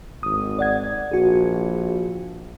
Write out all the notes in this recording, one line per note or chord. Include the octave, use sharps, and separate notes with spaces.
G#1 D#6
D5 F#5 G#6
A#1 F#4 G#4